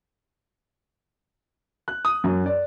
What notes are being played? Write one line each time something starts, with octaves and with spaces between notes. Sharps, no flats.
F#6
D#6
F#2
D5